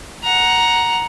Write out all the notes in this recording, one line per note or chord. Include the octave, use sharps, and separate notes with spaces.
F#5 A#5